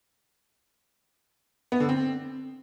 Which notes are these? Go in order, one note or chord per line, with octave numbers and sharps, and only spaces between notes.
B3
D3
C4